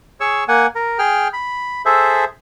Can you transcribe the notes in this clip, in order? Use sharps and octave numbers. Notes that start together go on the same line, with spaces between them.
G#4 C#5 C#6 E6
A#3 F#5 G#5
A#4
G#4 G5 F6
B5
G#4 A4 C5 E5